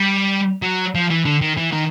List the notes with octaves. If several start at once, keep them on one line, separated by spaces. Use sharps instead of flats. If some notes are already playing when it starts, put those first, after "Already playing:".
Already playing: G3
F#3
F3
E3
D3
D#3
E3
D#3